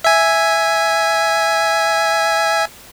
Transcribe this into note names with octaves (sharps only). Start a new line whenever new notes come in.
E5 G#5